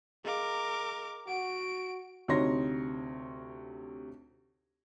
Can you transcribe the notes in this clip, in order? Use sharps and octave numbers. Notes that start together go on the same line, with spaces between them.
G#4 A#4 D#5 F5 D6
F#4 F#5 D7
D2 C3 D#4 C#5 C6 A#6